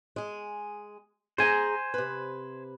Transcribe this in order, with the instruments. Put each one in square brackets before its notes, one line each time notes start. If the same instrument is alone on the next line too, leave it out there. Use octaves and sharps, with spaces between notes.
[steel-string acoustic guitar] G#3 G#4
[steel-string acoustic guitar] G#4 E5 A#5 [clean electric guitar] C5 G#5
[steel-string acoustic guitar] C3 B4